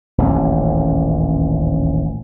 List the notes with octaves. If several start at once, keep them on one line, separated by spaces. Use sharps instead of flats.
D#1 A1 D2